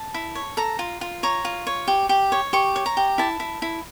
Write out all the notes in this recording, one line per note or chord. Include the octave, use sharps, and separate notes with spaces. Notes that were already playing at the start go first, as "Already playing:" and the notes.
Already playing: A5
E4
C#5
A4 A#5
F4
F4
C#5 A#5
F4
C#5
G4
G4
C#5
G4 C#6
C#5
A#5
G4
E4 A5
E4
E4